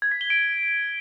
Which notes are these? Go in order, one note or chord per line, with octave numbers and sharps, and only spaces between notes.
G#6
B6
G7
D7